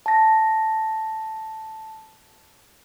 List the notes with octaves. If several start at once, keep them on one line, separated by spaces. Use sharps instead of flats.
A5 A#6